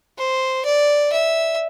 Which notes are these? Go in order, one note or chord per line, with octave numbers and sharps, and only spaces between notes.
C5
D5
E5